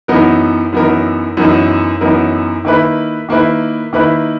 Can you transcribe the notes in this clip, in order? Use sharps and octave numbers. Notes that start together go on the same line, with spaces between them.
F#2 E3 B3 D#4 A#4
F#2 E3 B3 D#4 A#4
F#2 E3 B3 D#4 A#4
F#2 E3 B3 D#4 A#4
D#3 A#3 E4 B4
D#3 A#3 E4 B4
D#3 A#3 E4 B4